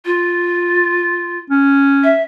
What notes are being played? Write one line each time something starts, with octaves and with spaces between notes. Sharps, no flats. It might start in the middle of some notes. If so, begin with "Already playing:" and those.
F4
C#4
E5